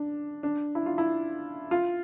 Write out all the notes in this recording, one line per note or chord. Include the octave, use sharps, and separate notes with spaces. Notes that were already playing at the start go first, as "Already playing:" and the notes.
Already playing: D4
D4
E4
F4
E4
F4